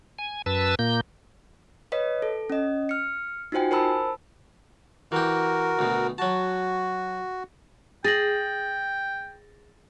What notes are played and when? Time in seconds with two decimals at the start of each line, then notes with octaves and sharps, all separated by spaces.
0.18 G#5
0.46 F#2 B4 A5 E6
0.79 A#2 A#3 G6
1.92 B4 C#5 D#5 B6
2.22 A4
2.50 C#4 D#5
2.89 F6 C#7
3.52 D#4 F4 F#4 C5 G5 G#5
3.71 A#4 C5 A5 B5 E6
5.12 E3 F#4 G4 A#4
5.79 D2 B2
6.18 F#3 F#4 A5
8.04 G#4 G5 A6 A#6 F#7